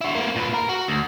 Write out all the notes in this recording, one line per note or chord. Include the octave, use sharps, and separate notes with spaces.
E4 F#4
A#3 B3
A#2 B4
A#4
F#4
D2